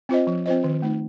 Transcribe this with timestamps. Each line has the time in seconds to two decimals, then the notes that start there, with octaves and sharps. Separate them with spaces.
0.09 C4 F4 C5 D#5
0.27 F3
0.46 C4 F4 C5 D#5
0.64 D#3
0.82 A3 D#4